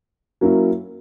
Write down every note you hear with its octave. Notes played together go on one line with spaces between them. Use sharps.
F#3 A#3 C#4 E4